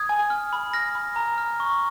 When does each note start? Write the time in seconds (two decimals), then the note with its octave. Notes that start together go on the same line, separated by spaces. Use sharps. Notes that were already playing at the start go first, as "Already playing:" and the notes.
Already playing: D#6 G#6
0.09 G#5
0.30 F6
0.53 B5
0.74 F6 A#6
0.95 B5
1.16 A#5
1.38 F6
1.60 C#6